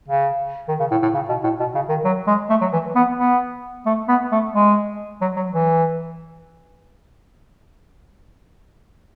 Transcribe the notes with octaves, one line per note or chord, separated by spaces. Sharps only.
C#3
D#3
C#3
A2
A2
C#3
B2
A2
B2
C#3
D#3
F#3
G#3
A3
F#3
E3
B3
B3
A3
B3
A3
G#3
F#3
F#3
E3